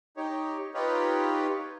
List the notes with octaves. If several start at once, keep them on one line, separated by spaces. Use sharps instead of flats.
D#4 G4 C#5
D#4 F4 G4 B4 C#5